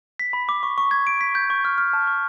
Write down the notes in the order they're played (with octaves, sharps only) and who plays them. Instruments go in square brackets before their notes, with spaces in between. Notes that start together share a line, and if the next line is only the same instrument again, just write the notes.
[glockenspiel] B6
B5
D6
C#6
C#6
G#6
D7
B6
G6
C#6
F6
F6
A5
C#6